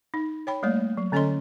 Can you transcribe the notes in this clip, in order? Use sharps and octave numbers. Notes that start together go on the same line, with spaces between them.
D#4
C#5 G5 B5
G3 A3 A#3 C#5
F#3
D3 C#4 A4 C#5 D#5 C6